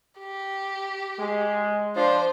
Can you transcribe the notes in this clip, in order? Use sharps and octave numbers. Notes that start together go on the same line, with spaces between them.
G4
G#3
F3 D4 C5